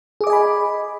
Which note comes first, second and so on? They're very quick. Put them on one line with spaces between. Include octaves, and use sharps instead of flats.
G#4 D6 D#5 G#5 B5